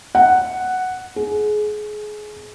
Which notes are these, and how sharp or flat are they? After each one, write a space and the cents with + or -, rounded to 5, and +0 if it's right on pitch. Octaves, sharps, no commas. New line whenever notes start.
F#5 +0
G#4 +25